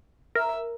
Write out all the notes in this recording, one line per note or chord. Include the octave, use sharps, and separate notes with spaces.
A#4 E5